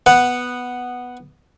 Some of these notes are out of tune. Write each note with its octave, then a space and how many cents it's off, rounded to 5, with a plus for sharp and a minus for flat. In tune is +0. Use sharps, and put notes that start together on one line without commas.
B3 +0 F#5 +0